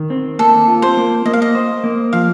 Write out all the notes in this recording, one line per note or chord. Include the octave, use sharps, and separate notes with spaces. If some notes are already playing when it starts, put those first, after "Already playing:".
Already playing: D#3
C4
A#3 A4
F4
C5
A#3
A#3 D#5
F5
D#5
C5
A#3
F3 F5